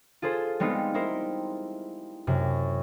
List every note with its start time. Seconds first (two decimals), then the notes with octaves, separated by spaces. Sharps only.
0.22 F4 G#4 A4 C5
0.60 G3 G#3 B3 C4 D#4 F4
0.94 D#4 E4 A#4 C5
2.27 F#2 C3